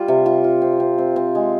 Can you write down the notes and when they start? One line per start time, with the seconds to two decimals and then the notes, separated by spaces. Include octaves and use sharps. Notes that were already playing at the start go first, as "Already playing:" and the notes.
Already playing: G3 F4
0.08 C3
0.26 F4
0.44 F4
0.62 C4
0.80 C4
0.98 C4
1.16 C4
1.35 G#3